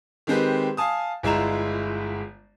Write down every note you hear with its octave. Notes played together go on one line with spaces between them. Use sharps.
D#3 G#3 C4 G4 B4
F5 G#5 A5 D#6
G1 G#3 E4 F4 A#5 E7